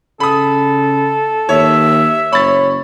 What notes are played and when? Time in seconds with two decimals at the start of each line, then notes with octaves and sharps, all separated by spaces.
0.20 C#3 A4 B5 D#6
1.49 D#2 C#5 E5
2.33 F#1 C#5 B5 A6